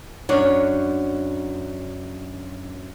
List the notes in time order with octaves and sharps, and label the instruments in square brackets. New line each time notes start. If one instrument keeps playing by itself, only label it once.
[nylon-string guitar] F#2 D4 C#5